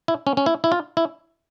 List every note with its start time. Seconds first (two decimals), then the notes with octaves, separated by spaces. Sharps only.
0.08 E4
0.27 C#4
0.37 C#4
0.46 E4
0.64 E4
0.72 F4
0.97 E4